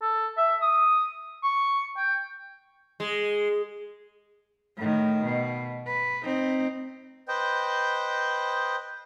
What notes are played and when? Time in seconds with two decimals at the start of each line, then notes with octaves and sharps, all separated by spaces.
0.02 A4
0.37 E5
0.62 D#6
1.43 C#6
1.97 G5
3.00 G#3
4.77 A2 D#3
5.23 B2
5.87 B4
6.23 C4 D#4
7.28 B4 C5 D#5 G5